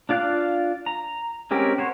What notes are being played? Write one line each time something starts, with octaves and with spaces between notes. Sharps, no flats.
D4 F4 D5 F5 F#6
A#5
G#3 C4 C#4 G4 A#4
F#4 C5 C#5